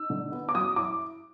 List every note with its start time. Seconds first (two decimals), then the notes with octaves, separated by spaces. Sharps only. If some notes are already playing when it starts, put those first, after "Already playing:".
Already playing: D#4 E6
0.10 D3
0.32 B3
0.49 D6
0.55 F#3 D#6
0.76 E4 D6